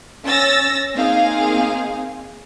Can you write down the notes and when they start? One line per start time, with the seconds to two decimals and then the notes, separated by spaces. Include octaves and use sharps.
0.25 C#4 E6 A6 A#6
0.95 A#3 C4 D#4 G#4 F5